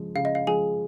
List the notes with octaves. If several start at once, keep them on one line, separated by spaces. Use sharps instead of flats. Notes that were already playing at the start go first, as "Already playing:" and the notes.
Already playing: C#3 F3 G#3
C#3 F5
D#5
F5
F3 G#3 G#4 G#5